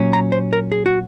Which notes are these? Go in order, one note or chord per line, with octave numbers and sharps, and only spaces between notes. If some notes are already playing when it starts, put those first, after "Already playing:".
Already playing: A#2 F#3 C#4
A#5
C5
A#4
G#4
F#4